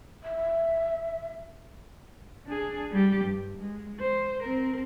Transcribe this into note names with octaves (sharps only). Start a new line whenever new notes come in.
E5
D4 G#4
G3 G4
G2
G#3
C5
C4 A#4